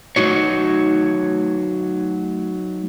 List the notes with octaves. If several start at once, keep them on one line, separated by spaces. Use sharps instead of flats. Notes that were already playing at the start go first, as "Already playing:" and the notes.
F#3 A3 D#4 F#4 C#5